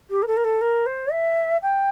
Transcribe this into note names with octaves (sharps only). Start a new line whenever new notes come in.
G4
A#4
A4
A#4
A4
A#4
C5
E5
G5